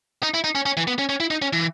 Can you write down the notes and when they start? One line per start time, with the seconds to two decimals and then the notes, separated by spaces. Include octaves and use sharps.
0.23 D#4
0.34 E4
0.44 D#4
0.55 C#4
0.66 C#4
0.77 E3
0.88 B3
0.99 C#4
1.09 C#4
1.20 E4
1.31 D#4
1.42 C#4
1.53 E3